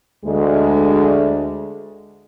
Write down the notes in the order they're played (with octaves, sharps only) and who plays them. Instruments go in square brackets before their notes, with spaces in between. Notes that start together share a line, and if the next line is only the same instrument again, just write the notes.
[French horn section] D2 G#3